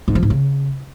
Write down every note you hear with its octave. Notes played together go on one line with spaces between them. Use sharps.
G#2
F3
G#2
C#3